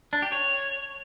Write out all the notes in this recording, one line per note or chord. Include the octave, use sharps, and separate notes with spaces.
D4
G4
C#5